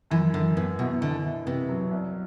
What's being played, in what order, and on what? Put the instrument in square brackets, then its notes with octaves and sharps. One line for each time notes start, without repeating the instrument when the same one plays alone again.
[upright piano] F#2 [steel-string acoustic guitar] E3
[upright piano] F#2 [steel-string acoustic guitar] D3
[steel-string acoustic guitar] A2 [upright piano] B3
[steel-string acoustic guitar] B2 [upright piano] E3
[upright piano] B2 [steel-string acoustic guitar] D3
[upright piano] E4
[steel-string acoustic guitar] C3 [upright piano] B3
[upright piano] F#3
C2